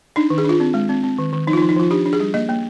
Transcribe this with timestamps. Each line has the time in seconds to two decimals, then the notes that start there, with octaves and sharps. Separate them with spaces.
0.16 D4 D#4
0.30 D#3
0.38 G#4
0.45 D4 F4
0.60 C4
0.74 G#3
0.89 C4
1.04 C4
1.19 D#3
1.33 D#3
1.47 F3 D#4
1.53 F4
1.58 D#4
1.62 F3
1.69 D#4
1.76 F3 F4
1.91 D4 G4
2.06 D4
2.13 G#4
2.20 G3
2.34 A#3 D#5
2.49 A#3